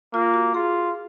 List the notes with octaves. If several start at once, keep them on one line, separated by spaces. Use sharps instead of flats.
A#3 F4
F#4
F4 G#4